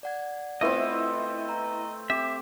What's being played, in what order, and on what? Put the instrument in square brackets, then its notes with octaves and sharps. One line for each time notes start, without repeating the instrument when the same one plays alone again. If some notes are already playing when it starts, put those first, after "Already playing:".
[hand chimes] D5 F#5 G#6
[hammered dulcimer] A3 C4 [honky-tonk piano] B3 E4 F4 [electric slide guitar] D#5
[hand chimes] A#5
[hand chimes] C4 D6 [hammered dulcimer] G4 [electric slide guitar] E5